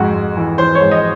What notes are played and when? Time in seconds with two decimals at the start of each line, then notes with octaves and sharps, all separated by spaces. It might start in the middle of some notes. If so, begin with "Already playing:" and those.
Already playing: F2 G#2 F#4
0.14 G#2
0.37 E3
0.58 E3 C5
0.75 C#5
0.80 G#2
0.91 D#5